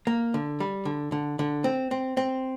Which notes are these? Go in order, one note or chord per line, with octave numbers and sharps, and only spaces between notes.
A#3
D3
G3
D3
D3
D3
C4
C4
C4